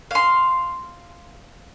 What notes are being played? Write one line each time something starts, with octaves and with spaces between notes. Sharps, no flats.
F5 C6